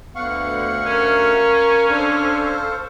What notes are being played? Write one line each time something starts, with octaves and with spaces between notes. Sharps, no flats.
D2 D3 B3 F5 F#5 C#6
C#4 A#4
D4 A4 C5